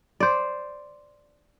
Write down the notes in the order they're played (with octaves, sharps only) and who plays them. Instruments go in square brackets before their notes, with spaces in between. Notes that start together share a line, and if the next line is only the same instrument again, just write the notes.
[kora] C5 D5